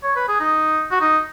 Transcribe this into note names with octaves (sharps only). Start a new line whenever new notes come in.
C#5
B4
G#4
D#4
F#4
D#4